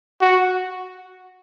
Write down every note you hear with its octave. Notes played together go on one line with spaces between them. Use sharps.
F#4